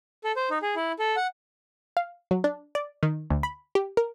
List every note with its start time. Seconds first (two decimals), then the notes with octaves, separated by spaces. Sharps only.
0.24 A4
0.36 C5
0.51 D#4
0.62 G#4
0.76 E4
0.99 A4
1.16 F#5
1.97 F5
2.31 F#3
2.44 D4
2.75 D5
3.03 D#3
3.30 D2
3.43 B5
3.75 G4
3.97 A#4